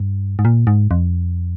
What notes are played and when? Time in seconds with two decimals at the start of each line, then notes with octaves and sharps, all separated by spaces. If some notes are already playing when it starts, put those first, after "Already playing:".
Already playing: G2
0.39 G#2
0.45 A#2
0.67 G#2
0.91 F2